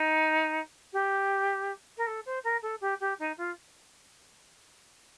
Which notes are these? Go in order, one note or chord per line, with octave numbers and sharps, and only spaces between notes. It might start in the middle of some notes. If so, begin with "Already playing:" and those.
Already playing: D#4
G4
A#4
A4
C5
A#4
A4
G4
G4
D#4
F4